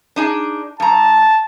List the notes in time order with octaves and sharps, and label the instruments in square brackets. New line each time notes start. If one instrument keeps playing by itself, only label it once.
[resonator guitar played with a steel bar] D4 D#4 G#4
[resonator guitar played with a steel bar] G2 A#5 [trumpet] A5